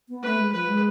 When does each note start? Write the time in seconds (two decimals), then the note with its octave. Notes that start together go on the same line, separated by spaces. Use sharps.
0.09 B3
0.23 A3 B4
0.38 G#3
0.53 F3 B4
0.67 G#3